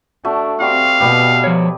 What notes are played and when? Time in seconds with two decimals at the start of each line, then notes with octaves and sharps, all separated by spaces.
0.25 A3 D4 F#4
0.60 G3 C4 F#4 F5
1.00 B2 G4 B4 D#5
1.44 F3 C#5